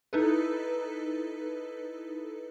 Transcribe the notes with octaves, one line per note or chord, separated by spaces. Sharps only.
D#4 E4 A4 B4